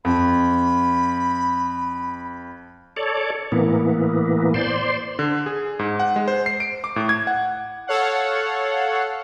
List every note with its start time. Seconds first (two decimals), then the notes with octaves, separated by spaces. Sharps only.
0.05 F2 B5
2.96 A4 C#5 D5
3.52 A2 E3 A#3 B3
4.54 C5 D5 C6
5.19 D3
5.46 G#4
5.79 G#2
5.99 F#5
6.16 G#3
6.28 C5
6.46 C7
6.60 D7
6.84 D6
6.96 A2
7.09 G#6
7.27 F#5
7.87 A4 C#5 F5 F#5